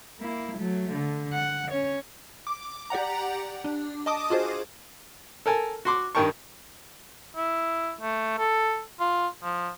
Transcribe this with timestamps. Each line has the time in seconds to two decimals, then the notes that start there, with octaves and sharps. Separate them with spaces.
0.20 A#3 E4
0.58 F#3 A3
0.93 D3
1.33 F#5
1.71 C#4 C#5
2.47 D6
2.90 G4 D5 F#5 A#5
3.64 D4
4.06 D#5 A5 D6 D#6
4.30 F4 F#4 G#4 C5
5.46 A4 A#4 G#5 A5
5.85 F#4 C6 D6
6.15 G2 D#3 A#4 G5 A5 C#6
7.36 E4
8.01 A3
8.39 A4
9.00 F4
9.43 F3